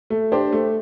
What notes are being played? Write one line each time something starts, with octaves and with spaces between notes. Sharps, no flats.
A3
D4 G4 C5
A3